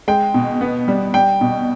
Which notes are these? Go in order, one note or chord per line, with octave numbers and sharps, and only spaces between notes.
G#3 G5
B2
B3
G3
G3 G5
B2